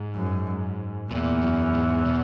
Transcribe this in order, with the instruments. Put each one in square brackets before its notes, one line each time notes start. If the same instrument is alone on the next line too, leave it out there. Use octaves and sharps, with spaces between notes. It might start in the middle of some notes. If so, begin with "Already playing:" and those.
Already playing: [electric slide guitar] G#2
[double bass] F#2
[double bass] E2 [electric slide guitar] A#2
[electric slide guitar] F#2
G#2
B2